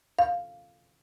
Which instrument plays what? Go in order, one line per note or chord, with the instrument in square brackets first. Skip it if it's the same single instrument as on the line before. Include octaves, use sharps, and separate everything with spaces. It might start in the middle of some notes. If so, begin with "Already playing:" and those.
[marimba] F5